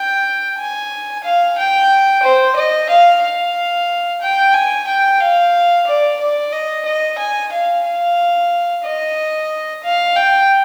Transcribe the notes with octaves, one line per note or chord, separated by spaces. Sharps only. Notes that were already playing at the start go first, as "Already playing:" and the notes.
Already playing: G5
G#5
F5
G5
C5
D#5
F5
F5
G5
G#5
G5
F5
D5
D5
D#5
D#5
G#5
F5
F5
D#5
F5
G5